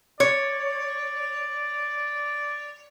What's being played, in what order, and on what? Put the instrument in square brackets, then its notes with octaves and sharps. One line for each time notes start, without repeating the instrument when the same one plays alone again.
[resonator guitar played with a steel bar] C#5 [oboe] D5